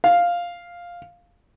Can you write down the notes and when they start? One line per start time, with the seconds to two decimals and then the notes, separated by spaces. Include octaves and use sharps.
0.04 F5